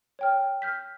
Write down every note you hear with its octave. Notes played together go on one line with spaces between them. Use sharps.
C#5 G5 F6
F6 G6 B6